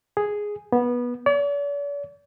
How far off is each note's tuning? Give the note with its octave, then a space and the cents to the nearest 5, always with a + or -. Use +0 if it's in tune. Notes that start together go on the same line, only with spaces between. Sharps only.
G#4 +0
B3 -20
D5 -45